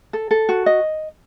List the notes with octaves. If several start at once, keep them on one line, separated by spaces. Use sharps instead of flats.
A4
A4
F#4
D#5